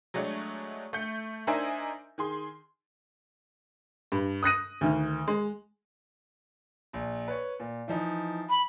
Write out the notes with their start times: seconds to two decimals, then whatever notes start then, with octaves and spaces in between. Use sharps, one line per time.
0.14 F#3 G#3 A3 D4 C#5
0.93 A3 G6 C#7
1.47 D4 D#4 A#4 C5 E5 G#5
2.18 D#3 G#4 C6
4.12 G2
4.43 D#6 F#6 A#6 D#7
4.81 D2 D#3
5.28 G#3
6.93 A#1
7.28 B4 C#5
7.60 A#2
7.88 E3 F3 D#4
8.50 B5